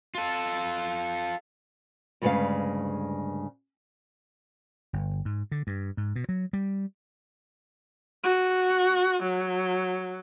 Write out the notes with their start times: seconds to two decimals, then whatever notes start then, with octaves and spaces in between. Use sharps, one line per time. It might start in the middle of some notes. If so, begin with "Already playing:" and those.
0.15 F4 A4
2.22 D2 G2 C#3 G#3 B4 F5
4.93 G1
5.25 G#2
5.52 D3
5.67 G2
5.97 G#2
6.16 B2
6.29 F#3
6.53 G3
8.24 F#4
9.23 F#3